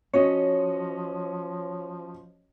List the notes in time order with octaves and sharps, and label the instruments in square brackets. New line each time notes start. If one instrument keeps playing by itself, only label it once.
[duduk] F3 [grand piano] C#4 F#4 D#5 [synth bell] C#5